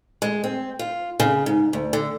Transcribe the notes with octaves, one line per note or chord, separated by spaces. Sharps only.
G#3
C4
F4
C#3
G#2
D2
D3